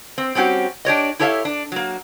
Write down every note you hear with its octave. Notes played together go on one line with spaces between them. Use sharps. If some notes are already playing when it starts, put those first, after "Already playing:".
C4
G3 C4 C#4 F#4 G4
D4 G4 C#5 D#5
E4 G4 A4 C#5 E5 F5
D4
F#3 A#3